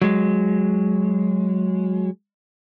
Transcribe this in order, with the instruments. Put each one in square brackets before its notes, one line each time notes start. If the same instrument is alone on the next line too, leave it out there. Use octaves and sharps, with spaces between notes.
[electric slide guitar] F#3 G#3